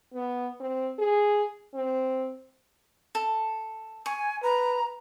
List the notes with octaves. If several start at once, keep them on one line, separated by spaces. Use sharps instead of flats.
B3
C4
G#4
C4
A4
G#5 C#6
B4 A#5